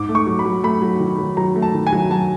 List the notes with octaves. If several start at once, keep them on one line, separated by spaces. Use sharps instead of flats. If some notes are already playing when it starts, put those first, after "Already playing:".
Already playing: G#2 D6
A3
C#6
F#3
B5
F#3
A3 B5
F#3
D#3
F#3
F#3 A#5
A3
A5
D#3
G#5
F#3
F#3 A5